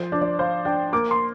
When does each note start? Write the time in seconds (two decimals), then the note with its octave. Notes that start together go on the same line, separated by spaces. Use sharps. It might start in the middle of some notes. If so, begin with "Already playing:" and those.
Already playing: F3 C5
0.12 D4
0.21 D5
0.39 C5 F5
0.65 D4 G5
0.93 A#3 D6
1.11 C6